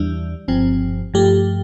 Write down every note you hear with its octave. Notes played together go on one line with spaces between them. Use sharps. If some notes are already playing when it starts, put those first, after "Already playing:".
Already playing: E2 E3 G3 D4
G1 G2 F3 C4
G2 F3 A3 G4